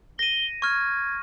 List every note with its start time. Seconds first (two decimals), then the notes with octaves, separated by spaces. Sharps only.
0.19 A#6 D#7 G7
0.62 C#6 F6 G#6